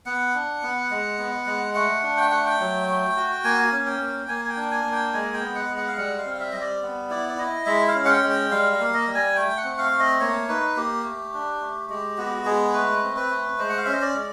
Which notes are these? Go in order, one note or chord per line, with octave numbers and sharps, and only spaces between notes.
B3 F#5
D4
B3
G#3
B3
G#3
A3 F#5
D4
G5
A3 F#5
G5
F#3
A3
F#4
A#3 G#5
C#4
G5
A#3
A#3 G#5
G#5
G5
D4
G#5
A#3
G5
G#3 G#5
G5
B3
F#5
G#3
F#5
F5
G3 F#5
F5
C4
F5
E5
G3 D#5
D5
B3
E4 D5
D5
E4 D#5
G#3 E5
F5
C#4
F#5
G5
G#3
G5
G3 F5
F5
A#3
D#5
G3
G#5
A3 G5
F#5
C4
F5
A3
D#5
A#3 C#5
D#4 B4
A#3 G4
A3
D4
A3
G#3 G4
B3 F#4
G4
F#4
G#3 G#4
A3 B4
C4
B4
A3
G#3 C5
F#5
F5
C#4 E5
D#5
D5
G#3